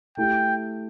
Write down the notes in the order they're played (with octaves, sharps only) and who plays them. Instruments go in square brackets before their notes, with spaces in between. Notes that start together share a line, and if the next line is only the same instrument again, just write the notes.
[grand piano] A3 E4 G4 [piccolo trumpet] G5